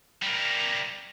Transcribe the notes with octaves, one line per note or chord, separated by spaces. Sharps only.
G3 A#4